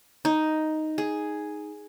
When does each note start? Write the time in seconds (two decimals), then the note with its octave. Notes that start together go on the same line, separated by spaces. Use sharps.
0.25 D#4
0.98 G#4